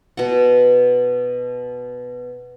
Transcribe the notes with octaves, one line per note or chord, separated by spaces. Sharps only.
B2 F#5